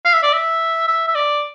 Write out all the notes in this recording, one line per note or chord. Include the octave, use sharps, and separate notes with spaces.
F5
E5
D5
E5
E5
E5
D5